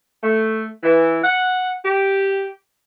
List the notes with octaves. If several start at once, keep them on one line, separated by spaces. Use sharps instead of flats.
A3
E3
F#5
G4